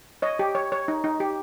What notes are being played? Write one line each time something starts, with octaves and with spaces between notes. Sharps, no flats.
C#5 D#5
G4
C#5
C#5
D#4
D#4
G4